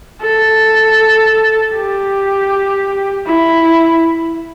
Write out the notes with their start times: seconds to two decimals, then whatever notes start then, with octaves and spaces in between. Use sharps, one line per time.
0.22 A4
1.74 G4
3.26 E4